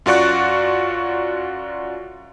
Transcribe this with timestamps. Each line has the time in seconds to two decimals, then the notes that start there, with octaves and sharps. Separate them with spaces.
0.06 F#2 F4 F#4 D5 C#6 F#6